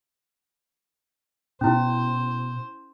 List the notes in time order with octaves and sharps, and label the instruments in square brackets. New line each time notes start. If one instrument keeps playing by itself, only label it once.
[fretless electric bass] B2 [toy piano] C#4 E4 [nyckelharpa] C5